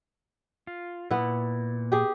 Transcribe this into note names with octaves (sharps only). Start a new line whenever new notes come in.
F4
A#2 B3 E4
G4 G#4